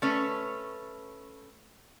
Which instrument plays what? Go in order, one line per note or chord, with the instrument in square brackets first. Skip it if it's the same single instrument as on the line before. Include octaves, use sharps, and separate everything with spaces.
[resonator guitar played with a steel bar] A3 C#4 B4 C#5